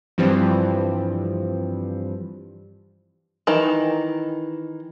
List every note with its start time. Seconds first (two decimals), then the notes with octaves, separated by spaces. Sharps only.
0.18 G2 E3 F3 G3 C4
3.47 D#3 E3 D#4